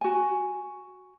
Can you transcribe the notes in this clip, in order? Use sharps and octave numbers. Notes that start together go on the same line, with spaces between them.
F#4 G#5